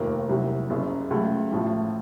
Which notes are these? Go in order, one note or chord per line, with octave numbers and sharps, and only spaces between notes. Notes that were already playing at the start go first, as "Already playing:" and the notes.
Already playing: F1 D#2 D#3 A#3 F4
C2 C3 F#3
F#1 F#2 C#3
C#2 C#3 F#3 A3
A1 A2 F3